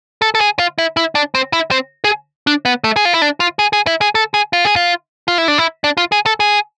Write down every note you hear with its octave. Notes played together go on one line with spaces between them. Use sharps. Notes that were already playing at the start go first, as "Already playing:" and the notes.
A4
A4
G#4
F4
E4
E4
D4
C4
E4
C4
G#4
D4
B3
A3
G#4
F4
E4
D4
F4
G#4
G#4
E4
G#4
A4
G#4
F4
G#4
F4
F4
E4
D4
E4
D4
F4
G#4
A4
G#4